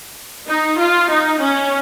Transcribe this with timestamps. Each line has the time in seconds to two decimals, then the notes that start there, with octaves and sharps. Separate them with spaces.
0.49 D#4
0.79 F4
1.10 D#4
1.41 C#4